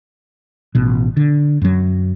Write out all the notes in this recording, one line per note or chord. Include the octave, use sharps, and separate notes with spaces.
A1 B2
D3
F#2 F#3